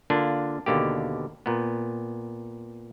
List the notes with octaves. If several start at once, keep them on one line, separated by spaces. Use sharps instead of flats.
D3 A#3 D4 F4
D#2 B2 D3 A#3 G4
A#2 B3